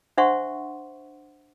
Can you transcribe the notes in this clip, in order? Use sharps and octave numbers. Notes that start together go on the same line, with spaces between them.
D4 C5 E5 F#5 C6 C#6